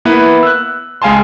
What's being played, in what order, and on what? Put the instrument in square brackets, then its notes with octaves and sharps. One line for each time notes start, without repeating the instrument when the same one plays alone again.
[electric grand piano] A#3 B3 E4 B4
E6 F#6
C#2 G#3 F5 G#5 A5 C6